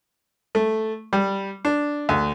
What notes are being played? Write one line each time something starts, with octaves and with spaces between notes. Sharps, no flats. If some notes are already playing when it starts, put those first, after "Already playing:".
A3
G3
D4
D2